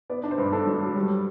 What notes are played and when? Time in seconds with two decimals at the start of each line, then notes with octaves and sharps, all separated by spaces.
0.10 B3 D5
0.23 D4
0.31 C5
0.38 G2
0.52 D4 A4
0.67 F#3
0.81 F#3
0.96 G3